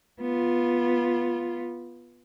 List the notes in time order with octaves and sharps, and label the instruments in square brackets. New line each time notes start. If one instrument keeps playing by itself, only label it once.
[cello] B3 F4